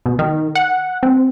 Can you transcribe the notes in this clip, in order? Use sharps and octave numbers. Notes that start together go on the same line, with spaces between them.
B2
D#3
F#5
C4